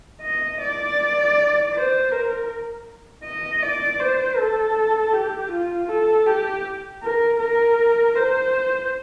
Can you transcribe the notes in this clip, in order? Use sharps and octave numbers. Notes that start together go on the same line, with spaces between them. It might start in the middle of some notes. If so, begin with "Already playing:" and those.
D#5
D5
C5
A#4
D#5
D5
C5
A4
G4
F4
A4
G4
A#4
A#4
C5